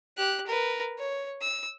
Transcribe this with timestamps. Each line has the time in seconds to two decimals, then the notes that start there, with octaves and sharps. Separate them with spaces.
0.17 G4 F#6
0.46 A#4 B4
0.98 C#5
1.41 E6